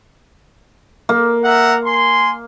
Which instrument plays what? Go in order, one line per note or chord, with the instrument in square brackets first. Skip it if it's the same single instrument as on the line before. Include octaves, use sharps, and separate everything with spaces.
[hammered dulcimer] A#3
[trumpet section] E5 F#5 A#5
G#5 C6